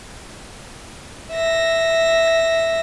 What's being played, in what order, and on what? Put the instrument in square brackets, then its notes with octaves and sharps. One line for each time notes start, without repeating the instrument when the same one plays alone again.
[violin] E5 A#6